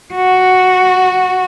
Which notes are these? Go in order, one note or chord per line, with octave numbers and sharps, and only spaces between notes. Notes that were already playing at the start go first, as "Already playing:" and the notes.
F#4